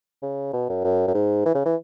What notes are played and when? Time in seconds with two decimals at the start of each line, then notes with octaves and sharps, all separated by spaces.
0.23 C#3
0.54 B2
0.69 F#2
0.85 F#2
1.08 F#2
1.15 G#2
1.46 E3
1.55 C#3
1.66 E3